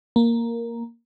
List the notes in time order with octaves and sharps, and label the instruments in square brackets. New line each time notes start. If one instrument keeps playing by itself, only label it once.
[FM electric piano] A#3